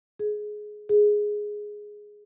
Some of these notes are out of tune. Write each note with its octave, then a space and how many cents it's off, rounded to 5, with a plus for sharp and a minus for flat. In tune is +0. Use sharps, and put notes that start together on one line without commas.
G#4 +15
G#4 +5